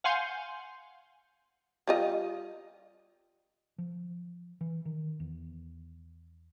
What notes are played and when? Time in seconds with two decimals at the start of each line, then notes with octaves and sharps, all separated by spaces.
0.04 F5 F#5 G#5 C6 G6
1.88 G3 F4 D#5
3.78 F3
4.61 E3
4.85 D#3
5.20 E2